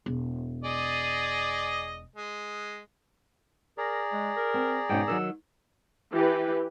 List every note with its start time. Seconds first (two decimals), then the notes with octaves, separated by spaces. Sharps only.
0.06 E1
0.64 G#4 D5 D#5
2.16 G#3
3.78 G#4 A#4 D5 A#5
4.13 G#3
4.36 A#4
4.54 C4
4.89 G#2 B2 C#4 G5
5.08 D#3 E3 F#3 E6
6.12 E3 G4 B4